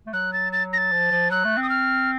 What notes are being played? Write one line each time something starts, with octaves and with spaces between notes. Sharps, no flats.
A3
F#3 F#6
A6
A6
A#6
A6
F3
F3
F#3 F#6
A3
C4
D#6
F6